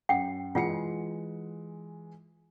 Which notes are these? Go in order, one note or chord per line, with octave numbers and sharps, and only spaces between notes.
F#2 F#5 G5
E3 G#3 F4 F#5 C#7